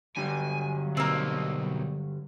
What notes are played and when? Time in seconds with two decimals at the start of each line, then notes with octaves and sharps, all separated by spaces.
0.17 G2 D3 F#3 G3 G#5
0.97 B2 A#3 C4 D#4